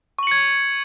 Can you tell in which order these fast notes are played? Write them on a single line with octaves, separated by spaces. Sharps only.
C#6 F#7 C#7 G#6